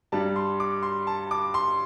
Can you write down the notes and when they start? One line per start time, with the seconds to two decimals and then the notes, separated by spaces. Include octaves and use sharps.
0.12 G2 G3 D4 A5
0.36 C6
0.60 D6
0.83 C6
1.07 A5
1.31 D6
1.54 C6